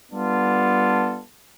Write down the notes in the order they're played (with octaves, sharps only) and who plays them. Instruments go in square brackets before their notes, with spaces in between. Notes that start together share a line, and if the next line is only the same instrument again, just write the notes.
[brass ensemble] G3 B3 D4 F4 A4